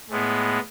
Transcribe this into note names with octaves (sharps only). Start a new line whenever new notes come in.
A2 G#3 B3